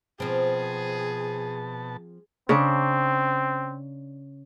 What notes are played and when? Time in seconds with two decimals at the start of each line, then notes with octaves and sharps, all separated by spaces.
0.20 B2 F3 C4 G#4 A5
2.49 C#3 C4 D4